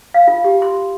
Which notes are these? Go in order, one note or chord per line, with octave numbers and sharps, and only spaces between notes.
F5
F4
G4
C6